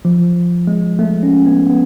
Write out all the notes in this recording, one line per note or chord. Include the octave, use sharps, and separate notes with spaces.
F3
G#3
A3
C#4
B3
B3